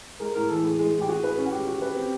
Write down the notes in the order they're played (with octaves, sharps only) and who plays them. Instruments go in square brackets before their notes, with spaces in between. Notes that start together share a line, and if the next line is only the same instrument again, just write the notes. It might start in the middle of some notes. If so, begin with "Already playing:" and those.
[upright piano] G#3 [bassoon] A#4
[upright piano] A2 [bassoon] A#4
[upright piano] E3 [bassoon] A4
[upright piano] A2 [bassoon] G#4
[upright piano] G#3
A2
[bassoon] G4
[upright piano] F#4 [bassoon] G#4
[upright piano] B4
C#4
[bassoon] F#4
[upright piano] G#3 [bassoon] G4
[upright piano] F#4
B4
C4